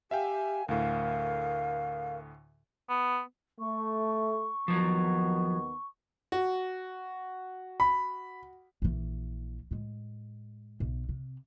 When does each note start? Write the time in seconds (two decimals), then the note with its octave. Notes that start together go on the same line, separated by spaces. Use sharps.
0.11 G4 E5 F5 G5 G#5
0.69 D2 A2 A#4 F5
2.90 B3
3.59 A3 C#6
4.68 D#2 D#3 F3 F#3 B3
6.32 F#4
7.80 B5
8.82 A#1 E3
9.71 A2 G#3
10.80 B1
11.09 C3